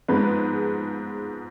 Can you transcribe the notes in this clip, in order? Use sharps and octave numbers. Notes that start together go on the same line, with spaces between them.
G#2 F3 G#3 B3 B4